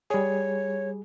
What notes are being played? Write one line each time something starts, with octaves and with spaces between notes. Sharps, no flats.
G3 G#4 C#5